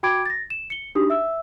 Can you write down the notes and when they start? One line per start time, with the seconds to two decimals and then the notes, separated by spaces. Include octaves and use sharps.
0.03 F#4 G5 B5 D6 G#6 D7
0.26 A6 A#6
0.50 E7
0.70 C#7 G7
0.95 D4 D#4 F#4 G4 D#6
1.10 E5 E6